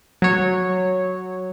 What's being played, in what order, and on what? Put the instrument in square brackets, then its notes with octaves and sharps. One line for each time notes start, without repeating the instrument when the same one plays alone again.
[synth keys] F#3 C#5